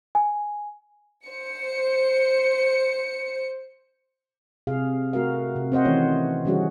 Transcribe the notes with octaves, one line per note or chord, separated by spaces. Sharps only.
G#5
C5 C#7
C3 G#4 F5
A3 F#4 A#4 F5
C3
C4 C5 D#5 F#5
D#3 E3 A3 C#4 C#5
D3 E3 G3 C#4 F#4 G#4